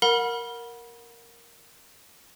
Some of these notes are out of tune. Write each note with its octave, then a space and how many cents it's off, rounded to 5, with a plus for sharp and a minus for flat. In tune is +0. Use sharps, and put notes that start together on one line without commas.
A#4 +0 F#5 -30 B5 -25